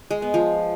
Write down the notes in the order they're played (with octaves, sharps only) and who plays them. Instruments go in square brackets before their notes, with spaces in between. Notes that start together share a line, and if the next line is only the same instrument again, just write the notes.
[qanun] G#3
B3
F3